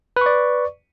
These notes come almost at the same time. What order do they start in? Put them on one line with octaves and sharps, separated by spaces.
B4 C#6 D5